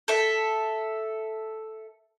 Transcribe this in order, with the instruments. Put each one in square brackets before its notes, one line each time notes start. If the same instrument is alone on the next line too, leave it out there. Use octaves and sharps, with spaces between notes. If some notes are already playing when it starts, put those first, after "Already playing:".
[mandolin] A4 E5